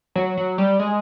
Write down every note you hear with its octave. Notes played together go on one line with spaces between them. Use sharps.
F#3
F#3
G3
G#3